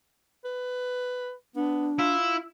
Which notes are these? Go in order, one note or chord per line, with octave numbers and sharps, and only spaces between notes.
B4
B3 D4
E4 F4